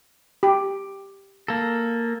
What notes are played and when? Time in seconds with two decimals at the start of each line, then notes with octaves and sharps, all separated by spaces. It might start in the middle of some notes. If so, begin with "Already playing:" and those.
0.43 G4
1.48 A#3 A4